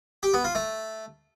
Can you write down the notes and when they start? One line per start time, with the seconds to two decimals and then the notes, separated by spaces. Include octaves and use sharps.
0.23 G4
0.34 B3
0.44 F4
0.55 A3